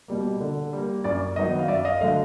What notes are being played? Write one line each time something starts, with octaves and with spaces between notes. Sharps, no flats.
B2 G3 A#3
D3
G3 A#3
F#2 D5
D#3 F#3 B3 D#4 D#5
F5
F#2 D5 E5
D#5 F5
D3 F#3 A3 D#5 F5